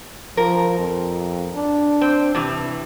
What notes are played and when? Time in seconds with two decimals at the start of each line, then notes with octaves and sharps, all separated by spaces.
0.37 F3 A#4
0.79 F2
1.55 D4
2.01 C4
2.35 G2 C3 E3